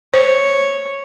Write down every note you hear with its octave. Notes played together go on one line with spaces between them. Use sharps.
C5 C#5